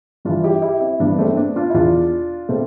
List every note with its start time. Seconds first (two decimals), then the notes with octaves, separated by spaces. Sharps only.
0.25 G2 E3 D4 F4
0.44 E4 G4
0.62 E4 G4
0.81 C4 E4
1.00 G2 E3 B3 D4
1.14 B3
1.18 A3 C4
1.30 C4
1.37 B3 D4
1.56 D4 F4
1.70 E4
1.74 E2 B2 D4 F4
2.49 B2 A3 C4